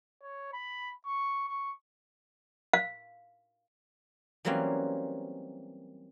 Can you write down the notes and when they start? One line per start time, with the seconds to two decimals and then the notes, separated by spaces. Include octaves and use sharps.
0.23 C#5
0.53 B5
1.06 C#6
1.48 C#6
2.73 F5
4.45 E3 F#3 G3 A#3 C4 C#4